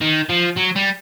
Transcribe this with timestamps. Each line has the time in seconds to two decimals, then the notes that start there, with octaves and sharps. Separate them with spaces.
0.01 D#3
0.29 F3
0.56 F#3
0.76 G3